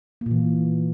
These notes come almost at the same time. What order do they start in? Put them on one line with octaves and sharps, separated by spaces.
A#3 A#2 E3